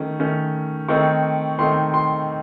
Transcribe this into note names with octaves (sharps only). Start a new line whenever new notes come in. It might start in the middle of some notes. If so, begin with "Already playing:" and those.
Already playing: D#3 A3 C#4
D#3 A3 C#4
D#3 A3 C4 D#4 C#6
D#3 A3 C4 D#4 C6
C6